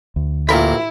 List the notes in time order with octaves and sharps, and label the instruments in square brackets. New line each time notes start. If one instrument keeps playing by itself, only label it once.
[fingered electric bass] D2
[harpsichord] A1 F4 [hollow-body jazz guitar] A#2 A#4 B5 [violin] E4